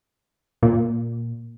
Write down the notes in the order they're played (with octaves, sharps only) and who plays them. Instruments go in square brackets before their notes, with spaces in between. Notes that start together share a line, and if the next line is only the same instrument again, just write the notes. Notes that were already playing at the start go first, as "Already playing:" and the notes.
[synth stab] A#2